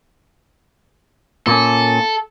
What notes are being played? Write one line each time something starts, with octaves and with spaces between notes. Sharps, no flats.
A#2 A#3 C#4 A4